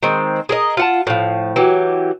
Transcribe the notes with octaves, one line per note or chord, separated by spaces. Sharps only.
D#3 G#3 C4
G#4 A#4 D#5
F4 F#5 A5
A2 F3
E3 F#3 G4